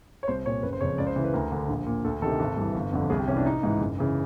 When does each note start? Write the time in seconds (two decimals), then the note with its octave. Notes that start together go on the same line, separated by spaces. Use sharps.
0.23 C#5
0.28 C2 C5
0.45 A#2 C#5
0.63 F#1 B4
0.73 C5
0.80 F2 C#3 C#5
0.98 C#2 D5
1.07 C5
1.16 C#3 E3
1.24 B4
1.34 D2 A#4
1.52 D3
1.68 A#1
1.86 A#2
2.04 D2 A4
2.22 C3 D#3 A4
2.40 G#1
2.57 G2 E3
2.75 G1
2.93 F2 D3
3.10 C2 G#4
3.19 G4
3.27 C3 E3 C#4
3.37 D4
3.45 A1 D#4
3.63 G#2 E3
3.80 F#1
3.98 C#3 E3